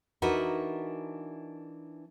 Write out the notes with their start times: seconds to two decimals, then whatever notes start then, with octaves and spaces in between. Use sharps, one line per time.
0.22 E3 D4 D#4 F#4 A#4 B4